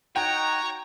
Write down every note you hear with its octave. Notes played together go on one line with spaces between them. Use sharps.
D#4 F#4 C#5 D#5 G5 A#5